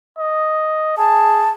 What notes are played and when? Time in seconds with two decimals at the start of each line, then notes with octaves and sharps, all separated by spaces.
0.18 D#5
0.98 G#4 A5